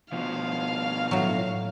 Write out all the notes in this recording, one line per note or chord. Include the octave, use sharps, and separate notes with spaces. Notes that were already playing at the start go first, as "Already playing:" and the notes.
B2 F3 F5
A2 F#3